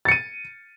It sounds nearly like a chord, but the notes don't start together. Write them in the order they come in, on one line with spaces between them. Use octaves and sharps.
A6 C#7 D#7